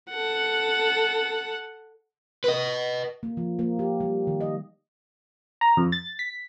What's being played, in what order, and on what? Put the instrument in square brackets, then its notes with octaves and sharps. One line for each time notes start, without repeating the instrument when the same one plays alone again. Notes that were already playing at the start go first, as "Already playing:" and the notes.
[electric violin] A4 F#5
[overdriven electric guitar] B4 D#5
[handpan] A#3
F3
A#3
G4
G3
D#3
D#5
[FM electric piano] A#5
F2
A6
B6